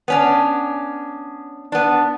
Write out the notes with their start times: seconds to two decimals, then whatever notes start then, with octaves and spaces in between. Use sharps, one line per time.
0.08 B3 C#4 D4
1.72 B3 D4